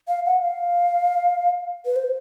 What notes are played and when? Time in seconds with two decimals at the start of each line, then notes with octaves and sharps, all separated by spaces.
0.08 F5
0.26 F#5
0.42 F5
1.86 B4
1.96 C5